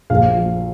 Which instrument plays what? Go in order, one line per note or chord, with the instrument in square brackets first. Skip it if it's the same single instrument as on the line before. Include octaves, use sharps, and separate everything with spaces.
[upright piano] A#1 F5
F3